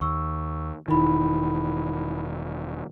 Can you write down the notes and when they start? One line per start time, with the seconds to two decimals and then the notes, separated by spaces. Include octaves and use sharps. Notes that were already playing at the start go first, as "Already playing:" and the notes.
0.01 D#2 C#6 E6
0.88 E1 D#3 D#4 E4 B5